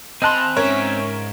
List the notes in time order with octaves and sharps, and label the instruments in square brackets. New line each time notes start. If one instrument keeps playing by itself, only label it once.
[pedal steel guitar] C4 F#6 [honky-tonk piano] D#5 A5 C6 [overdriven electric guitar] G#5 B5
[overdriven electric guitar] G#2 E5 [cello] C#4 [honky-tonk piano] A#4 C#5